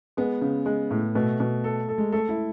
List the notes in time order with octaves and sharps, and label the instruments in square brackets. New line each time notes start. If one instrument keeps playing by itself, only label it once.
[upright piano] G#3 [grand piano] B3
[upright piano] C#3
G#3
A2
[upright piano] B2 [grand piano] A3
[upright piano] B2
A4
A4
[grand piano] G#3
[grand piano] A3 [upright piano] A4
[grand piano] E4